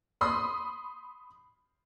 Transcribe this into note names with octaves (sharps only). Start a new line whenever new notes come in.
B5 C6 D#6